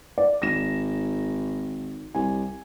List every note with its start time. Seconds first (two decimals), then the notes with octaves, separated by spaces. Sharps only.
0.18 D5
0.42 G#1 A#6 E7
2.15 C2 G#5